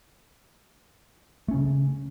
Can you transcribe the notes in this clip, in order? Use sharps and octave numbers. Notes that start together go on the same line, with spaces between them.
C#3 A3 C#4